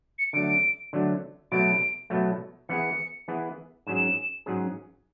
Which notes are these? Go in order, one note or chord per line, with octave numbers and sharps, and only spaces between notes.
C#7
D3 F#3 A3 D7
D3 F#3 A3
B2 F#3 A3 D7
B2 F#3 A3
E3 B3 E4 G#4 C#7
E3 B3 E4 G#4
G#2 F#3 C#4 G#4 E7
G#2 F#3 C#4 G#4